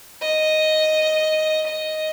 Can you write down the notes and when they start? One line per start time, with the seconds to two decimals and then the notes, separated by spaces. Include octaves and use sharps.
0.21 D#5
1.66 D#5